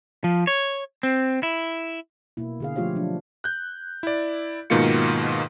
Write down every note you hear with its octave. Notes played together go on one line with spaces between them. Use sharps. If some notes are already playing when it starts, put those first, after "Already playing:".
F3
C#5
C4
E4
B2 A#3 E4
D3 G#4 F5
F3 A3 F4 G4 C#5 F5
F3 F#3 D4
F#6 G6
E4 D5
G#2 B2 D#3 A#3 F4 C#7